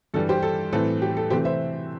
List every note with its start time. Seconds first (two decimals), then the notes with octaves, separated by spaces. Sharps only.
0.14 G2 E3 G3 A4
0.29 G4 C5
0.43 A4
0.73 A2 E3 A3 C4 A4
1.02 G4
1.17 A4
1.30 C3 E3 A3 C4 G4 C5
1.45 C5 E5